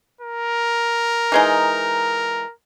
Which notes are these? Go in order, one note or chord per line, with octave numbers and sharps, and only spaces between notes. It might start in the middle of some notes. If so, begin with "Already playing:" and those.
A#4
E3 G#3 D#4